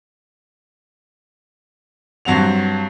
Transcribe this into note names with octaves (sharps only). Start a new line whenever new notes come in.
G2 F#3 C4 F#5 F7